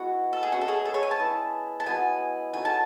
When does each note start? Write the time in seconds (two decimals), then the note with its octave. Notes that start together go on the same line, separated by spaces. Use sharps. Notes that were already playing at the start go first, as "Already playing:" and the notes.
Already playing: G#3 B3 E4 F#4
0.33 A4
0.43 G#4
0.52 C#4 E4 F#4 B4 E5
0.61 A4
0.68 G#4
0.85 A4
0.94 C#5
1.03 G#5
1.11 A5
1.20 E4 G#4 B4
1.80 A5
1.86 G#3 B3 F#4 B4 G#5
2.54 D#4 F#4 A4 C#5 G#5
2.65 A5